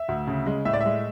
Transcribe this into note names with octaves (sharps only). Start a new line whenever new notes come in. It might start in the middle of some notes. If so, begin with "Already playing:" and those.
Already playing: E5
D2
C#3
G#3
A2 E5
D5
E5
G#3